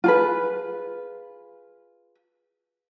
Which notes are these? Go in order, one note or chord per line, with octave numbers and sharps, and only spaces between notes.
F4 G#4 B4